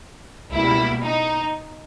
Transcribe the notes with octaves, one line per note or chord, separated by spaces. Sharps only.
C#2 B2 G3 A#3 E4
D#4